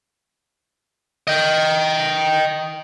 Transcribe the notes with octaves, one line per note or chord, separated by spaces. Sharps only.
D#5 G5